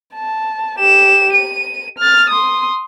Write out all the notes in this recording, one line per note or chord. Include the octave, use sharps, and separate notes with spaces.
A5
G4 E7
D#7
F6 A6
C6 D#6